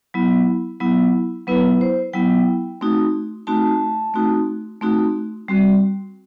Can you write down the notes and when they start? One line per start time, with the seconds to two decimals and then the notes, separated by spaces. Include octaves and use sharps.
0.14 F#3 B3 E4
0.80 F#3 B3 E4
1.47 F#3 B3 E4 B4
1.81 C5
2.13 F#3 B3 E4 G5
2.81 A3 C4 D#4 F#4
3.47 A3 C4 D#4 F#4 A5
4.14 A3 C4 D#4 F#4
4.81 A3 C4 D#4 F#4
5.48 G3 C4 F#4